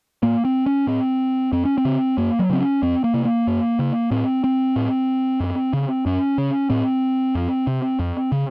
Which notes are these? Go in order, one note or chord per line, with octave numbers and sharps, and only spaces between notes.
A2 A#3
C4
C#4
A2 C4
F2 C4
C#4
C4
C#3
F#2 A#3
F#3
C#3 C4
C#4
F2 C4
A#3
C3
A#3
F#2
C#3
A2 C4
C4
A2
F#2
C#3
F#2 C#4
C#3
A2 C4
F2
C3
F2
C#3